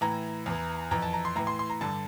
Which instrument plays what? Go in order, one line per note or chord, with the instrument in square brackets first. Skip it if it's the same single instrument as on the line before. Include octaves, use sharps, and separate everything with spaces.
[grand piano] A2 E3 A#5
E2 E3
F2 E3 A#5
A5
A#5
C6
A2 E3 A#5
C6
C6
A#5
G2 D3 A5